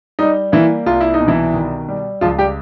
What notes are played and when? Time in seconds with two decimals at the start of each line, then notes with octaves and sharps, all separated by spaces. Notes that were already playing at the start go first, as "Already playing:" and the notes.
0.19 G3 D#4
0.52 E3 A#3 E4
0.86 C2 F4
1.01 E4
1.14 D#4
1.20 B2
1.28 E3 E4
1.54 D#3
1.88 G3
2.21 C#2 F3 F4
2.39 G3 G4